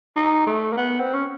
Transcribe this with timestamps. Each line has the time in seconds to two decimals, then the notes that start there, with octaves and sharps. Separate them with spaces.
0.16 D#4
0.47 A3
0.73 A#3
0.77 B3
1.00 C4
1.14 C#4